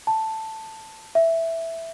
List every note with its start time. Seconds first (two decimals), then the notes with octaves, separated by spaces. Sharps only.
0.07 A5
1.15 E5